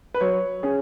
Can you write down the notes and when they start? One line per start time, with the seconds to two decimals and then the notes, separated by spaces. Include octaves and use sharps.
0.14 B4
0.21 F#3 C#5
0.63 C#4 G#4